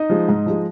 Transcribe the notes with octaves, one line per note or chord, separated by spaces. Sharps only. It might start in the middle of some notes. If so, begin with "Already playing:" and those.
Already playing: D#4 D#5
F3 G#3
G#2
F3 G#3